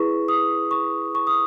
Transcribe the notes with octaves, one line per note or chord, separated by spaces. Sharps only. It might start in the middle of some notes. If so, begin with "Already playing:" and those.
Already playing: E4 G#4 B4 C#6
D#6
C#6
C#6
D#6